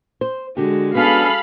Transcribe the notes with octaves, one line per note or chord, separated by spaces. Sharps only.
C5
D3 G#3 F#4 G4
B3 C#4 D4 G#4 A4 F5 B5